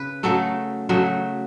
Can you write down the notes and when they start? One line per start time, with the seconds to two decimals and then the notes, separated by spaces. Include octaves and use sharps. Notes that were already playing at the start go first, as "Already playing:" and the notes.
Already playing: C#3 B4
0.23 C#3 F#3 A3 A4
0.89 C#3 F#3 A3